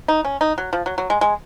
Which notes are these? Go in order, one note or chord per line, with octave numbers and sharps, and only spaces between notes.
D#4
C#4
D#4
F#3
F3
F#3
F#3
G#3
G#3